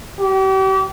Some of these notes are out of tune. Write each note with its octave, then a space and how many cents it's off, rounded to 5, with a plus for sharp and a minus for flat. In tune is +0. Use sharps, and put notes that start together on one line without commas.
G4 -40